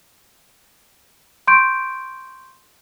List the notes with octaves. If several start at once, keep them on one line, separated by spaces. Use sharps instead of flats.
C6 C#6 G6 D7